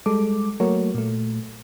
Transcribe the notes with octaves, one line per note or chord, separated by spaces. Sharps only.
G3 G#3 A4 D6
F#3 A3 A#3 F#4 A#4 C#5
A#2 A3